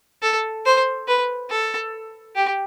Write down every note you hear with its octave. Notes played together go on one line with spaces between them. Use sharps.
A4
C5
B4
A4
G4